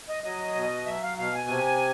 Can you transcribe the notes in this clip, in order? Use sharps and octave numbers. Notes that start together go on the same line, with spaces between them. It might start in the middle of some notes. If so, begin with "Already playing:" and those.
D#5
F#3 D#5
B2
F#3 E5
F5
B2 F5
G#5
C3